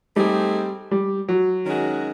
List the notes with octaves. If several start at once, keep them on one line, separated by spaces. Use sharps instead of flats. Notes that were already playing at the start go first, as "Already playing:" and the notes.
G3 A3 C4 D#4 G#4
G3
F#3
D#3 G#3 C#4 F#4